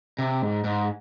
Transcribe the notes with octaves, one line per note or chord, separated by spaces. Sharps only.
C3
G#2
G#2